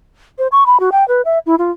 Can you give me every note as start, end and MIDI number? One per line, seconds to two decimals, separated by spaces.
0.39 0.48 72
0.52 0.64 85
0.66 0.80 83
0.80 0.90 66
0.92 1.07 79
1.08 1.22 71
1.25 1.39 76
1.46 1.55 64
1.59 1.71 65